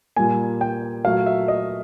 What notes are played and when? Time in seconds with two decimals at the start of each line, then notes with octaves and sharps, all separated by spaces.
0.16 A#2 G3 A#3 G#5
0.61 G5
1.05 A#2 F#3 A3 F5
1.26 E5
1.48 D#5